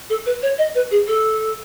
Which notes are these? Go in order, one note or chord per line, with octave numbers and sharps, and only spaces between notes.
A4
B4
C#5
D#5
B4
G#4
A4